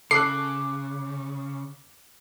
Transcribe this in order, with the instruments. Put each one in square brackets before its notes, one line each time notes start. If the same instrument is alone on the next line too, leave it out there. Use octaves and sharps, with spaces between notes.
[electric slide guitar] C#3 [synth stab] A4 [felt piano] D6 F#6 [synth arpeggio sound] C7